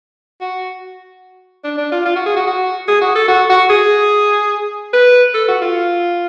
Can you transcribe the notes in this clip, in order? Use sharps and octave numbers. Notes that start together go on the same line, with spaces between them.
F#4
D4
D4
F4
F4
F#4
G#4
F#4
F#4
G#4
F#4
A4
F#4
F#4
G#4
B4
A4
F#4
F4